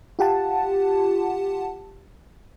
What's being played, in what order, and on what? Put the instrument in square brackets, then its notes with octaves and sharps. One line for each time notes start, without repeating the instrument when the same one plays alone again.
[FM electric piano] F4 G4 F#5 A5